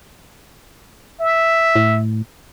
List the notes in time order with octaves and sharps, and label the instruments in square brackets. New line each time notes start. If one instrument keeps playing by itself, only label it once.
[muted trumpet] E5
[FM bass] A2